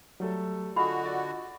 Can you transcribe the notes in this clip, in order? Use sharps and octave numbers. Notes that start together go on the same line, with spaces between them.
F#3 G3 A3 A4
D3 F4 F#4 G#4 D#5 B5
D5